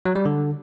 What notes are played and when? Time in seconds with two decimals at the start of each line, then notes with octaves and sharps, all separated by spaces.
0.05 F#3
0.15 G3
0.25 D3